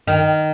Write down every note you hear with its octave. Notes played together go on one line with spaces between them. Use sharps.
D#3